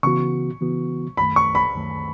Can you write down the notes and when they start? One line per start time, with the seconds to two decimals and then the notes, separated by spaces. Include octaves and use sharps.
0.03 C#3 E3 B3 F#4 C#6
0.61 C#3 E3 B3 F#4
1.17 F#2 D#3 A3 B5
1.36 C#6
1.55 B5
1.74 F#2 D#3 A3